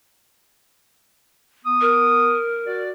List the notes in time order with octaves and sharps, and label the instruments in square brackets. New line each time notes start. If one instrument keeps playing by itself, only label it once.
[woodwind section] B3 D#6
[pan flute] A#4
[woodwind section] F#4 D5